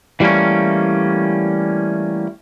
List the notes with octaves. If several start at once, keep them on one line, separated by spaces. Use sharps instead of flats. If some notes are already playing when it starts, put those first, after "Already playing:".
E3 G3 A3 A#3 C#4